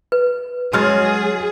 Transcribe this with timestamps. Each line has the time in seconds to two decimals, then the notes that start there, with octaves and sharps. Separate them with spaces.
0.12 B4
0.73 F#3 G#3 C#4 G#4 C6 F6 A6